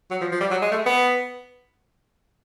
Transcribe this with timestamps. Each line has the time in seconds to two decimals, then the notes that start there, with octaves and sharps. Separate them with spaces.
0.11 F#3
0.21 F3
0.32 F3
0.41 G3
0.51 F#3
0.62 G#3
0.72 A3
0.86 B3